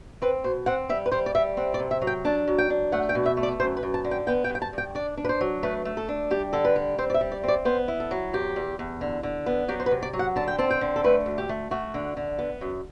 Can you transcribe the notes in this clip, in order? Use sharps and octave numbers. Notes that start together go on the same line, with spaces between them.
C4 B4
B2 C5
C4 F#5
G3 E5
B4
G3 C5
D5
G3 E5
C4 F#5
D5
C3
E5
F#3
G5
D4 A5
F#3
G5
D4
A3 F#5
G5
B2
E5
A3
D5
F#2 C5
B4
F#2
A5
D3
G5
B3 G5
G5
G2
G5
A5
G2 G5
D4 D5
D4
B4
C5
F#3
A3 B4
A3
A4
D4
G3 G4
D3 A4
B4
G3
C4 C5
D5
E5
G3
D5
C4 D5
B3 C5
E4
A4
F#3
E2 G4
E2
E2
D3
D3
B3
F#3 G4
C5
B4
C3
D5
F#3
F#5
D3 A5
G5
C4 A5
G5
D3
A4
A3 B4
D2
G4
A3
A3 F#4
D3
D3
B3
F#2